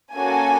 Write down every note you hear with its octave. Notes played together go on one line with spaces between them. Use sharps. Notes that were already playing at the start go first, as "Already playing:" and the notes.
A#3 C#4 F#4 A4 G#5